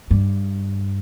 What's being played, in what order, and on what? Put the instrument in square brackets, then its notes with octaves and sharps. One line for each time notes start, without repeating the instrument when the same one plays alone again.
[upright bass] G2